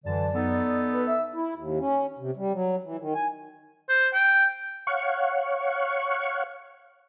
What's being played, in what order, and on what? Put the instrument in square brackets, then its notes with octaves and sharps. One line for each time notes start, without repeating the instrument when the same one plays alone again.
[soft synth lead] F#2 [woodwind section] D3 E3 A5 [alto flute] D5
[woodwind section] B3 D#4 A4
[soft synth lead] B4
E5
[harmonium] E4
D#2
C#4
C3
G3
F#3
E3
D#3
G#5
[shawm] C5
G5
[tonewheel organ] C#5 F5 F#5 C#6